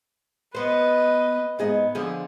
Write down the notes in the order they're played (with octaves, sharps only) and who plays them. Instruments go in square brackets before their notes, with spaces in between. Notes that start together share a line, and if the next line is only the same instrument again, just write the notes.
[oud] B3 C5 [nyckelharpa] B4 D#5
[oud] G#2 G#4 D#5 [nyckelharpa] B3
[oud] D3 F3 G#4